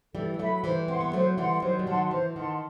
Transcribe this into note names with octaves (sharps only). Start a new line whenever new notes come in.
E3 G3 A4
G3
F#3 A3 E5 B5
E3 G3 C5
C4 F#5 C6
B3
F#3 A3 C5
E3 G3 F#5 C6
D#3 F#3 C5
G3
D#3 F#3 F#5 A5 C6
E3 C5
D#3 F#5 A5 C6